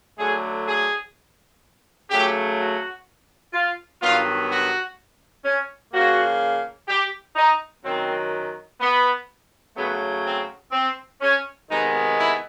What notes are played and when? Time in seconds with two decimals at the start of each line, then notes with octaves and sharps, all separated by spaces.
0.17 D3 F#3 A3 G#4
0.65 G#4
2.09 C#3 F#3 A3 G4
2.58 F#4
3.53 F4
4.00 G2 D#3 F#3 B3 F4
4.50 F#4
5.45 C#4
5.93 C#3 F3 A#3 F#4
6.88 G4
7.36 D#4
7.84 F#2 D#3 F#3 C4
8.80 B3
9.76 C#3 F#3 A3 B3
10.24 C4
10.72 C4
11.20 C#4
11.68 C3 D#3 G#3 B3 D#4
12.16 E4